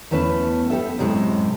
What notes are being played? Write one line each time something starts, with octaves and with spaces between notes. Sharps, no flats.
E2 A3 C#4 B4 A5
B3 G4 A4 E5
F#2 A2 C3 G#3 A4